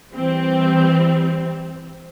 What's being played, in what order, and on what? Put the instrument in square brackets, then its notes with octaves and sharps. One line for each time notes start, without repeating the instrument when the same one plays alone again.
[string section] E3 G3 C4